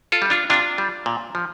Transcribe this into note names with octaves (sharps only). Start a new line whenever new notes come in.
F4 A4
G3
D4 F4
C3 D4 F4
G3
A#2
F3